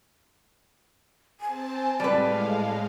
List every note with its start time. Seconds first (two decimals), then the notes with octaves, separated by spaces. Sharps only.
1.41 C4 C5 G#5 A5
2.00 A2 G3 G#3 B4 F5 A5